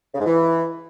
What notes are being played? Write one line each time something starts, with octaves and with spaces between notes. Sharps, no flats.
C#3
G#2
E3